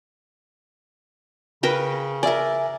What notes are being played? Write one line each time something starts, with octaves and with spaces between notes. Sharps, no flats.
C#3 A#4 B4 G5
A#4 D5 E5 G#5